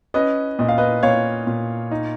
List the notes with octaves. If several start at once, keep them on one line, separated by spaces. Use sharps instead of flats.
C#4 B4 D#5
A#2 D#5
F5
B4 D#5
A#2 C#5 F5
A#2
D#4